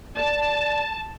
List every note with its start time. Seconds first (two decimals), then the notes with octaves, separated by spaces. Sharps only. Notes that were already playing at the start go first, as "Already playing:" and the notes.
0.16 D5 A5